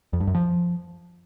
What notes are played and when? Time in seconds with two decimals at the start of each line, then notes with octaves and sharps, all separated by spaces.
0.13 F2
0.20 G2
0.27 F#2
0.35 F3